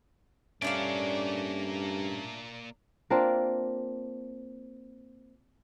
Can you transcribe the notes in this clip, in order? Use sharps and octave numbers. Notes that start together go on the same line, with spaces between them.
G2 A3 A#3 C#4 D4 D5 F5
A#3 C4 D4 F4